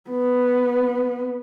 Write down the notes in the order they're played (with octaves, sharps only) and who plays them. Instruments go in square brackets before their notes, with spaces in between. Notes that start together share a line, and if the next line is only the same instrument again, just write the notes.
[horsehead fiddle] B3